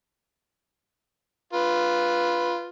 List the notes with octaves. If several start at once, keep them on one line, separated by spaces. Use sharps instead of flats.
F4 B4